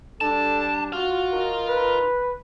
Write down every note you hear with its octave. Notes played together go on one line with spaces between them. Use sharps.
G3 D4 A4 A5
F4 F#4 F5
D#4 A#4
B4